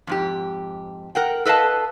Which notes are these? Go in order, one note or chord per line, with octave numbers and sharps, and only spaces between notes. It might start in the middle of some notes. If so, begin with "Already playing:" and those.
F2 G#2 G4
A#4 F#5 G5
A4 B4 D#5 F5 A5